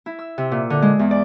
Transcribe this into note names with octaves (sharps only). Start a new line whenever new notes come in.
E4
E6
C3
A#2
D3
G#3
E2
D5